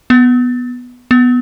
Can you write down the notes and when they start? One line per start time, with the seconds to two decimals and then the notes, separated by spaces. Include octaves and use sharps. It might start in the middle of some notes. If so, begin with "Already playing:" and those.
0.10 B3
1.11 B3